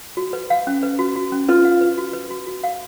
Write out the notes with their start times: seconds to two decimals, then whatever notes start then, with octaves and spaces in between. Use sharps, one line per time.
0.17 F#4
0.33 B4
0.50 F5
0.67 C#4
0.83 B4
0.99 F#4
1.16 F#4
1.32 C#4
1.48 F4 B4
1.65 F5
1.81 B4
1.98 F#4
2.13 B4
2.30 F#4
2.47 F#4
2.63 F5